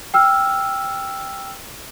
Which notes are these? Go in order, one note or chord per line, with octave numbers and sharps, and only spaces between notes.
G5 E6 F6